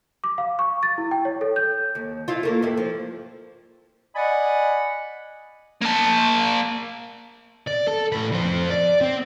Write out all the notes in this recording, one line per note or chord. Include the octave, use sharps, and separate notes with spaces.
D6
F5
C#6
A6
E4
G5
C#5
A4
G6
D#2
E4 F4
A3 A#3
G2 E4
F3
D5 D#5 F#5 G#5 B5
A#3 A5
D5
A4
A2 B4
F2 C5
D5
C4